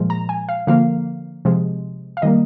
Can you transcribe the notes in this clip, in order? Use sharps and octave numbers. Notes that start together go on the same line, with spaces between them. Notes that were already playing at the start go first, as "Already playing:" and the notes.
Already playing: A#2 F3 G#3
A#5
G#5
F5
D3 F3 A#3 F5
C3 F3 G#3
F5
D#3 G3 A#3 D#5